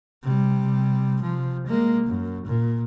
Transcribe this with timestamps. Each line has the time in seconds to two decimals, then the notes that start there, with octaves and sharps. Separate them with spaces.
0.23 C3 G3
1.21 C3 F3
1.67 G#3 A#3
2.06 F#2
2.46 A#2